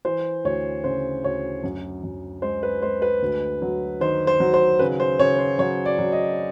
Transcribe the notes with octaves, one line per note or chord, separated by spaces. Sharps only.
E3 C5
D2 C#5
C#3 C5
D2 C#5
F#2
F#2
G#3 C5
B4
G#3 C5
B4
D2
F#3
D#3 C5
C5
F#3
C5
C#3 B4
C5
C#3 C#5
C5
F#3 C#5
D5
F#3
D#5